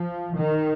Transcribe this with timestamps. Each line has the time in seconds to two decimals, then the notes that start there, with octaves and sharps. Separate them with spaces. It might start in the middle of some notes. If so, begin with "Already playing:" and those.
Already playing: F3
0.38 D#3